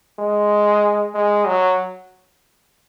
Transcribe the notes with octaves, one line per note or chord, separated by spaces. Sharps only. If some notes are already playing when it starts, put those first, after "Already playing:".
G#3
G#3
F#3